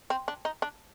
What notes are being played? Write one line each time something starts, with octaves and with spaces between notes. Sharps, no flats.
C4
D4
D#4
D4